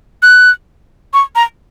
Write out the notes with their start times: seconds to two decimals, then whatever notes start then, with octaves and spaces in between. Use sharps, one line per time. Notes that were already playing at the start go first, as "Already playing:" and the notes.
0.23 F#6
1.14 C#6
1.35 A#5